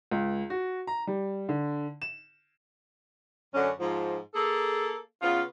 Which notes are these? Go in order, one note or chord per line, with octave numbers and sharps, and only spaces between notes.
C#2
F#4
A#5
G3
D3
E7
F#2 D3 F#3 C#4
G#2 F3
A#3 G#4 A4
C#3 B3 F4